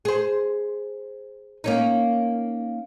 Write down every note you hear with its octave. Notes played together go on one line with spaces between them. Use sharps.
G#4 C5
A#3 C#4 D#4